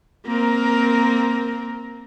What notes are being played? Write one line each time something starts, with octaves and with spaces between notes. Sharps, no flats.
A#3 C4 A#4